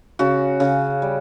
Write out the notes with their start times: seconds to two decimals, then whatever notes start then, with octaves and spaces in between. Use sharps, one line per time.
0.19 C#3 F#4
0.60 C#3
1.02 G3